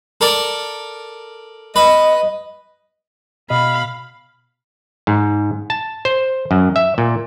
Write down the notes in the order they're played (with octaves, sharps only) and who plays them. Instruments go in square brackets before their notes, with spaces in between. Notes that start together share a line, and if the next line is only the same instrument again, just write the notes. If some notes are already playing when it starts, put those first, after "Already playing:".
[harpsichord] A4 A#4 D5
[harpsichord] B4 [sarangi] D#5
[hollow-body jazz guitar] B2 D#5 [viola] F5 B5
[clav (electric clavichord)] G#2
A5
C5
F#2
E5
A#2